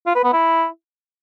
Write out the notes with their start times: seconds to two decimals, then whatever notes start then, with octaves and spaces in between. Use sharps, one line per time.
0.06 F4
0.15 B4
0.24 B3
0.33 E4